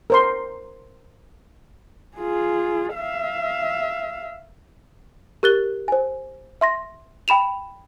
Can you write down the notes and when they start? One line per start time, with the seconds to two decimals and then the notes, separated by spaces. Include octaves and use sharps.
0.10 A#4 C5 C6
2.17 F4 G#4
2.94 E5 F5
5.43 G4 A#4 F#6 A6 G7
5.88 C5 G#5
6.61 E5 C6 A#6
7.28 G5 B5 E7 F7